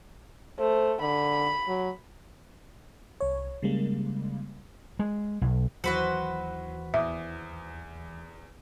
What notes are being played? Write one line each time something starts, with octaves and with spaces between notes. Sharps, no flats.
A3 C5
D3 B5
F#3
C2 C#5
C#3 G3 G#3 A#3
G#3
B1
D#2 E3 F#3 F#4 B4 C5 C#7 F#7
E2 E5 D6 D#6